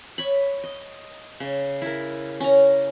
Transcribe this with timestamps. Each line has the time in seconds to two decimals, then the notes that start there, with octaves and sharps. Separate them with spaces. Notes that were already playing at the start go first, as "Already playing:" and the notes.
0.18 C#5 B5
0.64 D#5
1.40 C#3
1.82 E4 A#4
2.40 C#4 A#5